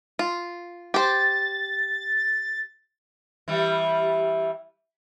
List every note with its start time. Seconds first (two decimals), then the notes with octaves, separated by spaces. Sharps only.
0.19 F4
0.94 G4 C5 A6
3.48 E3 G3